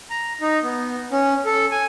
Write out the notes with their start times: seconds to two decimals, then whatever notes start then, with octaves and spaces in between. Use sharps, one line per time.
0.10 A#5
0.41 D#4
0.63 B3
1.12 C#4
1.45 A4
1.72 G#5